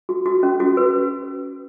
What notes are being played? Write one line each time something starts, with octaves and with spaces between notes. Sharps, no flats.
F#4
F#4
C#4
F#4
B4